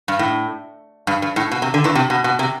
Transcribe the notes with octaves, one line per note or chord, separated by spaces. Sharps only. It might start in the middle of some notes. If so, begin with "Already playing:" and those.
G2
A2
G2
G2
A2
B2
C3
D3
E2 E3
C3
B2
B2
C3